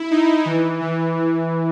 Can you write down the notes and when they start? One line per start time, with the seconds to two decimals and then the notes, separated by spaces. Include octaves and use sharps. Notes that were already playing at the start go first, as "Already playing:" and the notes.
Already playing: E4
0.11 D#4
0.45 E3
0.81 E3
1.16 E3